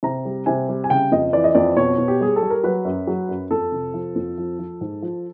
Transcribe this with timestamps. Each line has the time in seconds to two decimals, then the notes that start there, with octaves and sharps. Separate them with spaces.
0.03 C3 A#5
0.25 G3
0.46 C3 G#5
0.69 G3
0.84 G#5
0.90 C#3 G5
1.12 F2 D#5
1.33 E3 D5
1.44 D#5
1.55 F2 D5
1.76 B2 C#5
1.98 B2
2.08 G4
2.21 G3 G#4
2.36 A4
2.42 G3
2.50 A#4
2.64 F#3 B4
2.85 F#2
3.07 F#3
3.29 F#2
3.50 F2 A4
3.72 C3
3.94 F3
4.16 F2
4.38 F3
4.59 F3
4.81 G#2
5.02 F3